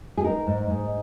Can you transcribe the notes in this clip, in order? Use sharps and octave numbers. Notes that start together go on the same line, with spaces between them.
G#4
D#4 A#4
G#2
G#2